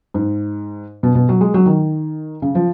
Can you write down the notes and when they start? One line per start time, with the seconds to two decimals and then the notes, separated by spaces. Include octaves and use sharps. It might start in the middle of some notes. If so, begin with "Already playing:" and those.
0.14 G#2
1.03 B2
1.15 B2
1.29 F#3
1.41 G#3
1.54 F#3
1.66 D#3
2.42 C#3
2.55 F3